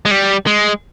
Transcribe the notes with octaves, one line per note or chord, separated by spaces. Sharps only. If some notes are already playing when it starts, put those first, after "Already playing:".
G#3
G3
G#3